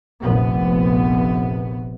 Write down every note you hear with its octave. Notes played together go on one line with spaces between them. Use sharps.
F1 A#1 B3